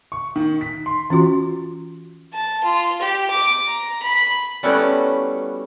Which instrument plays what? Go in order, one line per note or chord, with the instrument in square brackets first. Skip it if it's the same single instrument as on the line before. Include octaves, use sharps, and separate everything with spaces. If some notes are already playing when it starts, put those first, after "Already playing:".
[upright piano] C#6
D#3
B6
C6
[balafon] E3 C#4 F4 F#4
[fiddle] A5
F4
G4
D6
A#5
B5
[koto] G3 A3 B3 C#4 E4 F#4